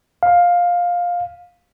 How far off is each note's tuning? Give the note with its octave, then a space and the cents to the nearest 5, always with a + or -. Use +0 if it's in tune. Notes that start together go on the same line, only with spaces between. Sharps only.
F5 +10